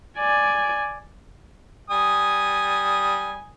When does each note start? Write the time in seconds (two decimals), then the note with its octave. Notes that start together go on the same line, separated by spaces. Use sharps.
0.18 D5 G#5
1.90 G3 G#5 D#6